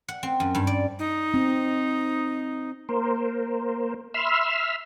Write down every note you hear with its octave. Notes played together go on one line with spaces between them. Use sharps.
F#5
C4
F#2
G2
D5
D#4
C4
A#3 A#4 C5
E5 B5 C6 E6 F6